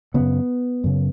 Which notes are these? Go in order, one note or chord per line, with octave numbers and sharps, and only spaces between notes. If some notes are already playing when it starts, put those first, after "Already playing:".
F#2 C#3 B3
F#2 C#3